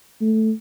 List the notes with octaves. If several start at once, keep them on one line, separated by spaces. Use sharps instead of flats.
A3